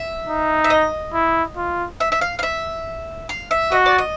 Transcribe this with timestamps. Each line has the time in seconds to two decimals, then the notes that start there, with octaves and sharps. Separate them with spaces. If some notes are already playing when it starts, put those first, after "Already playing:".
Already playing: E5
0.27 D#4
0.64 E5
0.70 D#5
1.13 E4
1.57 F4
2.00 E5
2.12 E5
2.21 F5
2.39 F5
2.43 E5
3.29 F5
3.51 E5
3.72 F#4 D#5
3.86 D5
3.98 D#5